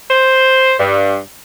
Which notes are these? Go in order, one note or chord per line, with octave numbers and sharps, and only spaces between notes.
C5
G2